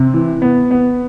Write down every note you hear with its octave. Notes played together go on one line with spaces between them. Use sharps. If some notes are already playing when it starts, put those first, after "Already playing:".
Already playing: C3 C4
E3
B3
B3